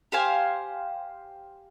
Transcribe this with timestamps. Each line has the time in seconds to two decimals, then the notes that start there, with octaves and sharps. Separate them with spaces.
0.12 G4 C5 F5 G#5